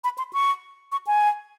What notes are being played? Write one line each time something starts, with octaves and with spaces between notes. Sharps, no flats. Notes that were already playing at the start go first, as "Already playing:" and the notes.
B5
C6
C#6
C#6
G#5